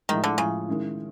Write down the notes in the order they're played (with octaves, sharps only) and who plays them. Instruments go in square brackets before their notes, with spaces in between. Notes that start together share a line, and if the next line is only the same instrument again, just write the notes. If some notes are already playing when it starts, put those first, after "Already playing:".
[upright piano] A2 F3 G#3 [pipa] D#3
[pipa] D3
[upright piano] A2 F3 G#3 [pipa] C#3
[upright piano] D#3 G#3 C#4 E4